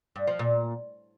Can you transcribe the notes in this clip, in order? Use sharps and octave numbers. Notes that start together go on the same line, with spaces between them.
G2
F3
A#2